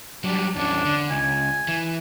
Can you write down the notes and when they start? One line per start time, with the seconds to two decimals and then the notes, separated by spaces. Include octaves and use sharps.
0.24 F#3 G3 D4
0.56 E2 C#4 D4
0.85 D3
1.10 C#2 G#5
1.68 E3